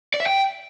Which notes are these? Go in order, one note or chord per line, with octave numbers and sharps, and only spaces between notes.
D5
E5
G5